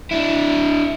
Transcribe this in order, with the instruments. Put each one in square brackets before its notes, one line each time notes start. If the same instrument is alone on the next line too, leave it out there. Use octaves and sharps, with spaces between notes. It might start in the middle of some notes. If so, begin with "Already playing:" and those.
[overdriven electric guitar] D4 E4